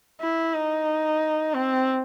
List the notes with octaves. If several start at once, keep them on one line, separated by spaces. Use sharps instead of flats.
E4
D#4
C4